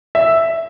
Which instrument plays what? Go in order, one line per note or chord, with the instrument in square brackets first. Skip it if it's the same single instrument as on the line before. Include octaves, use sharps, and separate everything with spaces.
[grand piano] E5